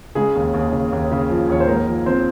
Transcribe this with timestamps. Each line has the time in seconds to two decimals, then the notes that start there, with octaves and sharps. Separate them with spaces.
0.15 C#3 G#3 G#4
0.35 D#2
0.54 D#2
0.73 C#3
0.92 D#2
1.12 C#3
1.30 F3
1.49 D#2 C#5
1.60 C5
1.68 G#2 A#3 A#4
1.87 F3
2.06 F3 C4 C5